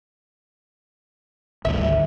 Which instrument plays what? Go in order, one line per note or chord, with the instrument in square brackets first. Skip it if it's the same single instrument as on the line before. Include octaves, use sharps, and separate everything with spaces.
[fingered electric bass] G#1 D2 G2 [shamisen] E5